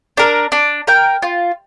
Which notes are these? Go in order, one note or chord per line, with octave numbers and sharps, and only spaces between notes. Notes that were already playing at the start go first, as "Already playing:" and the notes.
D4 A#4
D4
A#4 G5
F4